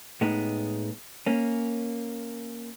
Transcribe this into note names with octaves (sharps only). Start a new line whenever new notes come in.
A2 G#3 B3 D#4
A#3 C#4